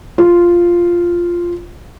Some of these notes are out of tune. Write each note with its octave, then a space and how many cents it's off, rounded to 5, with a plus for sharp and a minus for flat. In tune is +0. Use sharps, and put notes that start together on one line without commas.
F4 -5